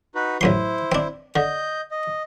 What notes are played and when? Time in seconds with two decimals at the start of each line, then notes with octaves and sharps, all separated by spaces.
0.15 D#4 F#4 B4
0.41 A1 F#2 E4 C5 C6
0.92 C4 D4
1.36 D3 D#5 G6
1.91 D#5